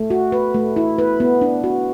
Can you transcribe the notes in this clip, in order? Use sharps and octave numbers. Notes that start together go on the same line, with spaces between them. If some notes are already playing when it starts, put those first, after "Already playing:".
Already playing: A3
F#4
B4
A3
E4
B4
B3
D4
F#4